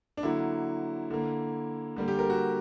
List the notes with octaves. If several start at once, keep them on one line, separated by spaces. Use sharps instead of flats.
D4
D3 F#3 A#3 E4
D3 A#3
D3 G3 A#3
G4
A#4
F#4